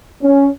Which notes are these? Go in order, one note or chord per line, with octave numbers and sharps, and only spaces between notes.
C#4